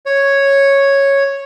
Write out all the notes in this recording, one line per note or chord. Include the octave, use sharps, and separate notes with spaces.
C#5